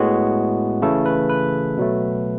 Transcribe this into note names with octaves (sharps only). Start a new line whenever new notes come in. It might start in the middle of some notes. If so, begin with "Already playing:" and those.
Already playing: A2 G#3 B3 F#4
C#3 E3 A3 A4
B4
B4
B2 F#3 A3